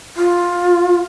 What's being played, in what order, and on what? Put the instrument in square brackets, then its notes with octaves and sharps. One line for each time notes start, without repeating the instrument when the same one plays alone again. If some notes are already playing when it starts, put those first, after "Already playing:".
[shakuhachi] F4